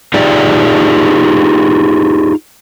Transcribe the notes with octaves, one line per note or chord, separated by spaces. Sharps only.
D#4 F4 G4 G#4 D5